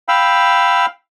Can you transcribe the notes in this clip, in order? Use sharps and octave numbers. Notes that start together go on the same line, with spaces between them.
F5 G5 B5 E6